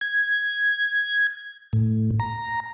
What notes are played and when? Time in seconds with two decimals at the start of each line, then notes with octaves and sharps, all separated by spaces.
0.01 G#6
1.73 A2
2.20 A#5